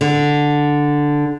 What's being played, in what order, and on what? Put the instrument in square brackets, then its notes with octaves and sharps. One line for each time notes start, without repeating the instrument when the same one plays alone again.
[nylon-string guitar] D3